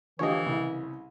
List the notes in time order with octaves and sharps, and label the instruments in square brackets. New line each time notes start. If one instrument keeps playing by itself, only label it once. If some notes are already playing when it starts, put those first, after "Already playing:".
[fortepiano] D3 F3 G4 [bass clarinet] E3 [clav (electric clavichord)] C#5 D#5
[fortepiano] C2 C#3